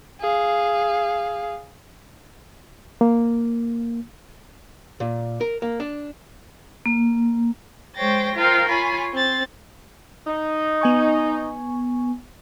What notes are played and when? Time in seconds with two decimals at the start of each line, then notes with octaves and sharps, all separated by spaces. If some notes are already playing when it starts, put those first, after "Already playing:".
0.21 G#4 F5
3.01 A#3
5.00 A#2
5.41 A#4
5.62 A#3
5.80 D4
6.86 A#3
7.96 G#3 C5 C#5 G5 A6 A#6
8.35 F4 A#4 C5 F5 G5
8.67 F4 C#5 G#5 B5
9.13 C4 A6
10.27 D#4
10.81 B3 G#5 C#6